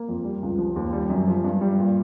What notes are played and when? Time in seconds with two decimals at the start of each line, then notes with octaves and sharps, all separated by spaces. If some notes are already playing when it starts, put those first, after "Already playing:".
Already playing: A#3
0.09 F2
0.24 G3
0.43 C#2
0.58 F3
0.76 D#2
0.93 G3
1.10 F#2
1.28 F3
1.44 G2
1.61 G3
1.78 A#2